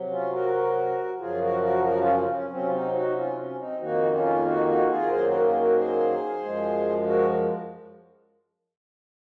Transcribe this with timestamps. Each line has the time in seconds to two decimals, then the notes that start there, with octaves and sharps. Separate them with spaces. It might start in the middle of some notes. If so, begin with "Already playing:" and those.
Already playing: C3 F#3
0.11 C#4 F4
0.32 F#4 A#4
1.19 F#2 C#3 F3 F4 G#4
1.41 F#4 A#4
1.63 F#4 A#4
1.84 F#4 A#4
2.01 C#4 F4
2.34 C#4
2.50 C3 F#3 C4 C#4
2.63 F4
2.72 C4 D#4
2.94 D#4 F#4
3.15 C#4 F4
3.37 C#4
3.59 C4 D#4
3.80 F2 D#3 A#3 D#4 F#4
4.13 C#4 F4
4.45 D#4 F#4
4.68 D#4 F#4
4.89 F4 G#4
5.03 A#4
5.11 F#2 D#3 F#3 A#3 G#4 C5
5.27 F#4 A#4
5.43 F4 G#4
5.60 F#4 A#4
5.76 G#4 C5
6.42 F#2 F3 G#3
7.07 F#4 A#4